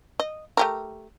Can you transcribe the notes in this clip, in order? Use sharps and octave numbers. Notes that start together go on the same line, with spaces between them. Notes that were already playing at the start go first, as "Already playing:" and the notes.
D#5
A3 G4 A#4